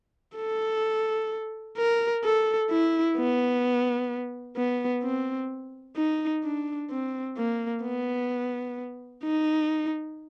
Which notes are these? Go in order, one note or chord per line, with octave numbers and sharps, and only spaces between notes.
A4
A#4
A4
E4
B3
B3
C4
D#4
D4
C4
A#3
B3
D#4